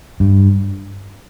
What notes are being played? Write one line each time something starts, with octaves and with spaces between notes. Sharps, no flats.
G2